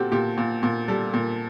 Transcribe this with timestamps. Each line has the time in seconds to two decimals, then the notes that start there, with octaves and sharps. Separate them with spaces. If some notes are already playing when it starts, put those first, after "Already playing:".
Already playing: A#2 C4 F#4 G4 A4
0.12 A#2 G4
0.38 A#2
0.63 A#2
0.88 G3 A4
1.14 A#2